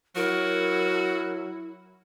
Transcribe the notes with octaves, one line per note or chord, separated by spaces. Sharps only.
F#3 E4 F#4 A#4